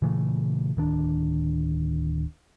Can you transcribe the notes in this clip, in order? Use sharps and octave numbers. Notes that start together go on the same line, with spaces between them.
A#2 C#3 E3 A3
D1 D#3 D4